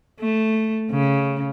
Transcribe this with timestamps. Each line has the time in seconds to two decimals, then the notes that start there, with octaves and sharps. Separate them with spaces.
0.20 A3
0.90 C#3